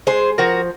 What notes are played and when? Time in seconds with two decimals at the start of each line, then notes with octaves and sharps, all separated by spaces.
0.07 G#3 G#4 C5
0.38 F3 F#4 A#4